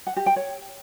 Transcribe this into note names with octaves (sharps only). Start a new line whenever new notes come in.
F#5
G4
G5
C#5